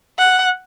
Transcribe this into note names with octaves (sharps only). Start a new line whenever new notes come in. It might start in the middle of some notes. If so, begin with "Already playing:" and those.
F#5